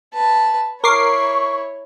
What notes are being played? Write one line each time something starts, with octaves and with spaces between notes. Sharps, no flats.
B4 A5
E4 A#4 C#5 C#6 D6 C7